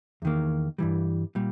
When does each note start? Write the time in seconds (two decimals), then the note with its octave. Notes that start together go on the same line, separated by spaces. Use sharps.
0.22 E2 D#3 A#3
0.78 G2 E3 G3
1.35 A#2 G3